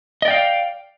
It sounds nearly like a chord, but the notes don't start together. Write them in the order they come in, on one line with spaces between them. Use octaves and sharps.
D#5 D5 G5 F5